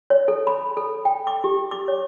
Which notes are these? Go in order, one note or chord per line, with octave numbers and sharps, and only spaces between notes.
C#5
A4
B5
A4
G5
D6
G4
D6
C#5